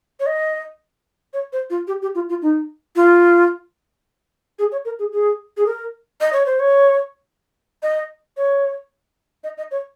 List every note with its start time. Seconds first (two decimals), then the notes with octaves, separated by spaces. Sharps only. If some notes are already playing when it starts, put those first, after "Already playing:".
0.20 C#5
0.26 D#5
1.34 C#5
1.53 C5
1.70 F4
1.88 G4
2.02 G4
2.15 F4
2.29 F4
2.42 D#4
2.96 F4
4.59 G#4
4.72 C#5
4.85 A#4
4.99 G#4
5.12 G#4
5.57 G#4
5.66 A#4
6.21 D#5
6.33 C#5
6.46 C5
6.60 C#5
7.83 D#5
8.37 C#5
9.44 D#5
9.58 D#5
9.71 C#5